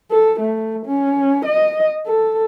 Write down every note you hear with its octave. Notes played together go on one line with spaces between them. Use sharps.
A4
A3
C#4
D#5
A4